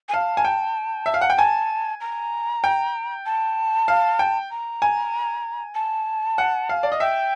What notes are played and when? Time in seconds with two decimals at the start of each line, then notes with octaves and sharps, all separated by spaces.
0.09 G#5
0.14 F5 A5
0.37 G#5
0.45 G5
1.06 E5
1.14 F5
1.21 F#5
1.30 G5
1.38 G#5 A5
2.01 A#5
2.64 G5
3.26 A5
3.88 F5
4.19 G5
4.51 A#5
4.82 G#5
5.75 A5
6.38 F#5
6.69 F5
6.83 D5
6.92 D#5
7.00 E5 G5